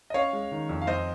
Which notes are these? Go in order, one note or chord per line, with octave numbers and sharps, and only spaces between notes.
D#5
C#4 C#5 F5
G#3
D#3
F2
F5
F2 C5 D#5